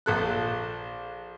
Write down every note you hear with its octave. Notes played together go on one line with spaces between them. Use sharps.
A#1 A4 F#6